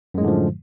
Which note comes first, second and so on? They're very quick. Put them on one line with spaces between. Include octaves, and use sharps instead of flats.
F#2 G#3 A2 D3 F3